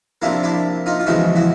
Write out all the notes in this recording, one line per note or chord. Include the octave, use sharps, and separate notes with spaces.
C3 F3 A#3 D4 E4
D4 E4
D#4 F4
F4
E2 C#3 F3 G#3 E4 F#4
E4 F#4